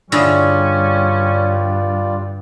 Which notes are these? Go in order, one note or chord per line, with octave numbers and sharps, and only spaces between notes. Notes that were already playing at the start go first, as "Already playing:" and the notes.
G2 D3 G3 C#4 E4 F4 G#4 D5